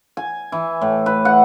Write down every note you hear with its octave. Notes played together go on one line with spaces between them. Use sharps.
G#5
E3
A2
B4
F#5